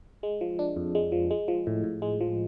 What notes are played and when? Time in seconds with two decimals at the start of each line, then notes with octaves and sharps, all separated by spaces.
0.23 G#3
0.41 F3
0.59 D4
0.76 F2
0.95 G#3
1.12 F3
1.31 G#3
1.48 F3
1.67 A2
1.84 A2
2.02 G#3
2.21 F3